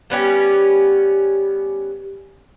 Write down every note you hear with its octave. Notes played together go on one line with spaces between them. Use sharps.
G3 B3 C#4 G4